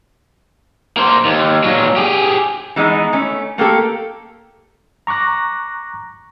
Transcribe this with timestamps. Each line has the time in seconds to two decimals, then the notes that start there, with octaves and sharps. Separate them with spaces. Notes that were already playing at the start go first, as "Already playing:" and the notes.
0.97 A#3 C5
1.25 D#2
1.64 A#2 F#3
1.96 G4 G#4
2.76 E3 G#3 B3 D#4
3.13 A3 C#4
3.58 A3 A#3 G4 A4
5.07 A#5 C#6 D6 F#6 A#6